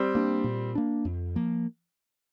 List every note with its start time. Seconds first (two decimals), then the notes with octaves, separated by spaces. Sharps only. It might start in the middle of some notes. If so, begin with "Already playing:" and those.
Already playing: G3 C4
0.15 A#3 D4
0.44 A#2
0.75 A#3 D4
1.05 F2
1.36 F3 A#3